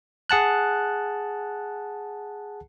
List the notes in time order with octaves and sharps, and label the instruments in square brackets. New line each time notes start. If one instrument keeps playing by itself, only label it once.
[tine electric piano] G#4 F#5 A5 F#6